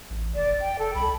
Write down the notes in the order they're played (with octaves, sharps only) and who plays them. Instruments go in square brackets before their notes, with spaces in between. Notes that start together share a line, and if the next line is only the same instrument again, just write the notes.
[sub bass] A1
[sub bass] F1 [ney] D5
[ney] G5
A4
[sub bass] C2 [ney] B5